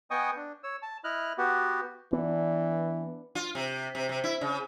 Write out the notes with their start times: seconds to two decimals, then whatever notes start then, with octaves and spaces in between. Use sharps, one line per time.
0.11 B3 D#5 G5 G#5 C#6 D#6
0.36 D4
0.63 C#5 E6
0.82 A5
1.04 E4 D#5 F6 F#6
1.38 B3 F#4 G4
2.13 E3 B3 D4 B4 F#5
3.35 F4
3.55 C3
3.95 C3
4.09 C3
4.24 E4
4.41 C#3